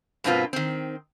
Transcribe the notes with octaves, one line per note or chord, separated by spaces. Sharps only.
G2 B2 A#3 C4 F4 B4
D#3 C4